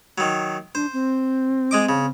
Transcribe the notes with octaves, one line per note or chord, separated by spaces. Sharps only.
D#3 F#3
D4 C5
C4
G#3 D#5 D6
C#3